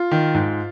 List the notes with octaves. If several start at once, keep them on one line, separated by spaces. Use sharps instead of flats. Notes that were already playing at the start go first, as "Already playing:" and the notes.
Already playing: F4
D#3
G#2